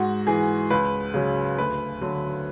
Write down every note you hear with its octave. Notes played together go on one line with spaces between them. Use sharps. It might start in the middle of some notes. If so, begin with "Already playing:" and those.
Already playing: G#2 F#4
E3 G#4
C#2 B4
C#3 F#3
D2 B4
D3 F#3